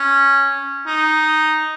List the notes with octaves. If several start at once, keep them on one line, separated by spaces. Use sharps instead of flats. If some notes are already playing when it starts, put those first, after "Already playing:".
Already playing: C#4
D#4